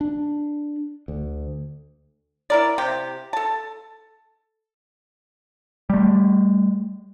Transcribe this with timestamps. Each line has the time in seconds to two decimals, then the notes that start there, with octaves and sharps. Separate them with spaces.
0.01 D4
1.08 D2
2.50 E4 A#4 D5
2.78 C3 G4
3.33 A4 A5
5.90 G3 A3